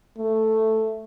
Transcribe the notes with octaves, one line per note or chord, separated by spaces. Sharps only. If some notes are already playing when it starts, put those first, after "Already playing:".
A3